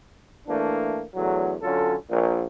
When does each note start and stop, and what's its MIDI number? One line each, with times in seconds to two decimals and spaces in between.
0.48 1.03 52
0.48 1.03 57
0.48 1.03 58
0.48 1.03 62
1.15 1.55 40
1.15 1.55 45
1.15 1.55 50
1.15 1.55 54
1.62 1.95 50
1.62 1.95 54
1.62 1.95 61
1.62 1.95 65
1.62 1.95 69
2.09 2.43 34
2.09 2.43 46